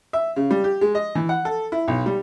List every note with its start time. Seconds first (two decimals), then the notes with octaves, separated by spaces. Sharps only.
0.13 E5
0.36 C#3
0.50 G3
0.64 G4
0.81 G#3
0.95 D#5
1.15 E3
1.29 F#5
1.45 A4
1.72 E4
1.88 B1
2.06 G3